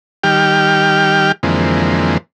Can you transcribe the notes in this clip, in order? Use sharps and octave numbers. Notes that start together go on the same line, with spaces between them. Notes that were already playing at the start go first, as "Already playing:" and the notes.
D#3 G3 G4 G5 F6
F2 D3 E3 G#3 A#3 C4